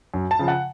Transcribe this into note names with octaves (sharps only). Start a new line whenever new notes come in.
F#2
A5
C#3 F3
F#5